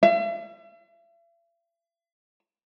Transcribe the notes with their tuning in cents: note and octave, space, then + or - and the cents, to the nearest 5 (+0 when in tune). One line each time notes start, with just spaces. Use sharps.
E5 +45